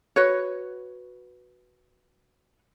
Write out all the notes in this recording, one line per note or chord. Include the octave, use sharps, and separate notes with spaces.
F#4 B4 C#5